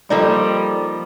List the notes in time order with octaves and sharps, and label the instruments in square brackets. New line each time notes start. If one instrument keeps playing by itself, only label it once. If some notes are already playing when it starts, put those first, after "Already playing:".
[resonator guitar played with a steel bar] F3 A#3 D#4 [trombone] G3 [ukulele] A4 C5 D5